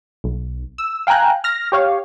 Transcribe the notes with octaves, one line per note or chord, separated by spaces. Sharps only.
B1
E6
F5 G5 G#5 A#5 F#6
F6 A#6
G4 C#5 F5